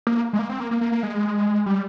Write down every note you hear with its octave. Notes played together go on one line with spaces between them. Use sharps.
A#3
G#3
A#3
C4
A#3
A#3
A#3
A#3
G#3
G3